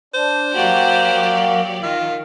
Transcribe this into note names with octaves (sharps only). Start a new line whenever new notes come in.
D4 C5
F#3 A#3 F#4 G4 D5
D#3 F4